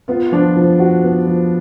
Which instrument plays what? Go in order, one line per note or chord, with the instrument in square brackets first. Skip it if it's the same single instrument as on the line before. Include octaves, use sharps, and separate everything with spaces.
[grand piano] B3 [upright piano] F4
[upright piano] F4
[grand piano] F3 [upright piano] D4
[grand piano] F3
F#4
B3
F3